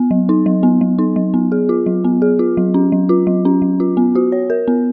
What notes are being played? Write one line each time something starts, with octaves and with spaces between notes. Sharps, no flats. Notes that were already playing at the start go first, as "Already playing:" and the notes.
Already playing: B3
F#3
D#4
F#3
B3
F#3
D#4
F#3
B3
G#4
F4
F#3
B3
G#4
F4
F#3
C#4
F#3
F4
F#3
C#4
F#3
F4
B3
F#4
C#5
A#4
B3